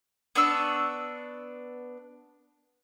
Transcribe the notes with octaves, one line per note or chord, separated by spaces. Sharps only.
B3 D4 C#6 E6